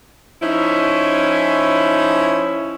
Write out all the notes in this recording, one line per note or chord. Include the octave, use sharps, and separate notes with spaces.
F3 C#4 D#4 E4